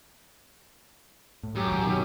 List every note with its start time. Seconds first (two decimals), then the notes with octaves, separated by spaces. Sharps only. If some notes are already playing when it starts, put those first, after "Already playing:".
1.43 A2
1.55 F#2 G4
1.67 D#1 G#1
1.82 B2 D#3 F#3 G4